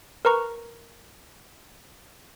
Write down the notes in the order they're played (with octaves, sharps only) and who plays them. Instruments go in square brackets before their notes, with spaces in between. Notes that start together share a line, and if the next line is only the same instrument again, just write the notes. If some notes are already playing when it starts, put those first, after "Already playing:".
[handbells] A#4 B4 A#5 C#6